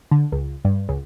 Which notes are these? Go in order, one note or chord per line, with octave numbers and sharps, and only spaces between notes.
D3
C#2
G2
C#2